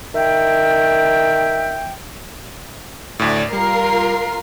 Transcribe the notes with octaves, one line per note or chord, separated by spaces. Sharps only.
D#3 E5 G5
D2 A2 D5
G3 F4 A#4 C7